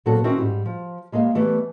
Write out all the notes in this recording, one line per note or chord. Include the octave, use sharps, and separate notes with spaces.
A#2 F#3 B3 C4 F#4 A4
D#3 C4 C#4 E4 F#4 A#4
G#2 G3
F3
G3 G#3 A#3 F5
E3 G3 A3 B3